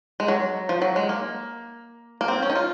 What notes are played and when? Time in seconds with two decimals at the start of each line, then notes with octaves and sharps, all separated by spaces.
0.20 G#3
0.28 F#3
0.69 F3
0.82 F#3
0.96 G#3
1.09 A#3
2.21 A#3
2.28 C4
2.42 C#4
2.49 D#4
2.55 F4